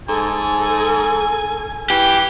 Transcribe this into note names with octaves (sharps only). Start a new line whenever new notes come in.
G#2 A4 G#5
E3 G4